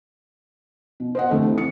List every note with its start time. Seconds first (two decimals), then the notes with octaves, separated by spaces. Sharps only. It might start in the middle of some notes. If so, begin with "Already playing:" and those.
1.00 B2
1.15 C5 D#5 F#5
1.30 C2 D3 A3 A4
1.44 C3 E3
1.58 C#7